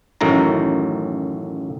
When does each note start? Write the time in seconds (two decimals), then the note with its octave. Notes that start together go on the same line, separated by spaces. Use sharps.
0.21 A1 F#2 A2 D#3 A#5